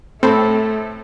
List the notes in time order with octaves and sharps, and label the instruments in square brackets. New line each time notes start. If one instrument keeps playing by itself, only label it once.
[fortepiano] A2 A4 B5 [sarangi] A3 [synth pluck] C4